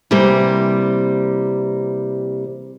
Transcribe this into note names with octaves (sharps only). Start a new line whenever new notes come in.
C3 E3 G3 A#3